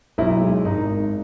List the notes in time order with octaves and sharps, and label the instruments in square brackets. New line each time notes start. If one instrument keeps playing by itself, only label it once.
[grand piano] B1 E4
G#3
G#1 D#4